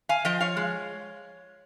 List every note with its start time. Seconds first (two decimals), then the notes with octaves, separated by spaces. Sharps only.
0.09 F5 G#5
0.25 F3 D#5 G5
0.40 C#5 F5
0.57 G#3